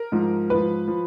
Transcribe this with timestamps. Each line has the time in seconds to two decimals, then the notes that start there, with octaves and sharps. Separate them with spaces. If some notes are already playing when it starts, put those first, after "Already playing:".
Already playing: A#4
0.12 G#2 F3
0.50 G#2 F3 B4
0.88 F3